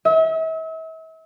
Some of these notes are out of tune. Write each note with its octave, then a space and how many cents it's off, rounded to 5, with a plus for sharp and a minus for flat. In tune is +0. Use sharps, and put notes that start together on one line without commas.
E5 -40